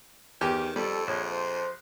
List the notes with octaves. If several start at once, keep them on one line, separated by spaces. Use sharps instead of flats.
E2 D#3 G4
F2 G3 A4
A#1 C#5
C5